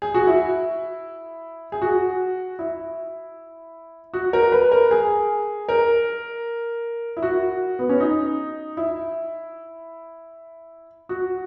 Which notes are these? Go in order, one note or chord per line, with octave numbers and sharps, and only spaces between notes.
G#4
F#4
E4
G#4
F#4
E4
F#4
A#4
B4
A#4
G#4
A#4
E4
F#4
B3
C#4
D#4
E4
F#4